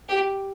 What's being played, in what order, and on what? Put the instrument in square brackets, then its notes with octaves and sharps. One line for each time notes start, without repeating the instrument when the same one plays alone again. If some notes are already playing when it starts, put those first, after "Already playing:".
[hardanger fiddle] G4